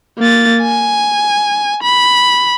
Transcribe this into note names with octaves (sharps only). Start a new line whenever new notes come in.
A#3 A6
G#5
B5